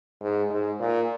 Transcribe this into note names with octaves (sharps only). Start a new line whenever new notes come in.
G#2
G#2
A#2